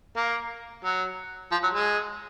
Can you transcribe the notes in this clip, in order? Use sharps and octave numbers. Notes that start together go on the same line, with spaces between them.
A#3
F#3
F3
F#3
G#3